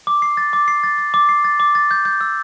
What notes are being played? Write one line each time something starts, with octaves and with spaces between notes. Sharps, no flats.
D6
C7
A6
D6
C7
A6
A6
D6
C7
A6
D6
A6
G6
G6
E6